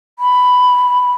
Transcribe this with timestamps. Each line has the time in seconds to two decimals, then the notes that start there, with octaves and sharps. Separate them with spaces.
0.19 B5